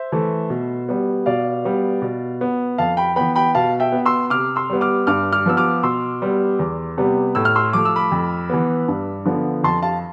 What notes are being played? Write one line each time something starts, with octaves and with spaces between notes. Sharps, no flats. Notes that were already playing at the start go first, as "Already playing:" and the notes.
Already playing: C5 E5
E3 A3
B2
G3 B3
B2 D5 F5
G3 B3
B2
B3
F2 F5 A5
G5 B5
E3 B3 G5 B5
G5 B5
B2 F5 A5
E5 G5
B3
C6 E6
C3 D6 F6
C6 E6
G3 B3
D6 F6
G2 D6 F6
D6 F6
F3 B3 E6
D6 F6
B2 C6 E6
G3 B3
E2
C3 G3 B3
A2 E6
F6
C6 E6
F3 A3 D6
E6
B5 D6
F2
E3 B3
G2
D3 F3 B3
F2 A5 C6
F5 A5